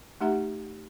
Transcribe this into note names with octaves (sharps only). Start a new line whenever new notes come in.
A3 D#4 G4 E5 F#5 A#5